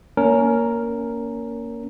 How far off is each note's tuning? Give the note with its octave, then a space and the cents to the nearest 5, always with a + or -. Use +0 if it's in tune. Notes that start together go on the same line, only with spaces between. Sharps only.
A#3 +0 C#4 +25 A#4 +0